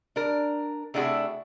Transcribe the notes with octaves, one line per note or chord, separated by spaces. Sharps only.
D4 A#4
C3 A3 D4 E4 F#4 G#4